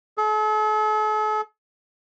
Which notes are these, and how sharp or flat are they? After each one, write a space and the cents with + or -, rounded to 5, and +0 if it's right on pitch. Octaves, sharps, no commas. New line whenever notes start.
A4 -45